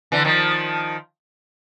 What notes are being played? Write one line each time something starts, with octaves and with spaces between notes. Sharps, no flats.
D3 E3
D#3 F3